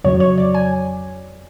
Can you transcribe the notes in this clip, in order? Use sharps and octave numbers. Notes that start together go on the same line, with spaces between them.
F2 C#3 F#3 C#5
C#5
D5
G#5